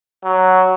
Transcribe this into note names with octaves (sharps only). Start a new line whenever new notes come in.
F#3